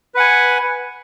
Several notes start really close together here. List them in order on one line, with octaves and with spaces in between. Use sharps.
B4 F#5 G#5